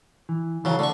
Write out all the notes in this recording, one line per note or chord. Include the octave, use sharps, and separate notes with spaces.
E3
C#3 E3 F#3 A4
D3 A3 C#6